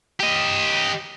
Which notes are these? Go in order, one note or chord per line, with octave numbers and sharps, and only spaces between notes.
G4 D#5